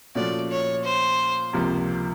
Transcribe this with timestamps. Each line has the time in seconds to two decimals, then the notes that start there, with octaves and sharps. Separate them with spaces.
0.15 A#2 F3 A3 C#4 F#4 D5
0.51 C#5
0.84 C5
1.53 C#2 C3 F3 A#3